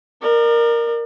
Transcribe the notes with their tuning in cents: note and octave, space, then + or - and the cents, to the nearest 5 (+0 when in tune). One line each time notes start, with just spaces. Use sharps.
A#4 +0 D5 +45